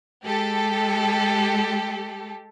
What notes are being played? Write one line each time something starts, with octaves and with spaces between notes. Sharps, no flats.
G#3 G4 A4